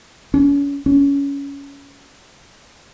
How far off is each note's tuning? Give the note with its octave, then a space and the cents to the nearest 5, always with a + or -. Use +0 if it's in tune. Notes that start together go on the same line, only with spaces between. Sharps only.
C#4 +35
C#4 +20